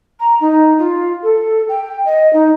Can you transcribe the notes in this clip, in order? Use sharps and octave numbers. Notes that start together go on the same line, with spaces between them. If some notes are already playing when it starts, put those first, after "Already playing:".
A#5
D#4
F4
A4
G5
D#5
D#4